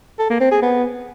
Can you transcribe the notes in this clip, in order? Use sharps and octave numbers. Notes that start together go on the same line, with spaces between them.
A4
A#3
C4
G#4
B3